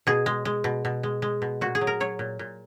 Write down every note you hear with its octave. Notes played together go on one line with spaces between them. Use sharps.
B2 G#4
G#3
G#3
B2
B2
G#3
G#3
B2
A#2 F#4
G#4
F#3
A#4
F#3 C#5
A#2
A#2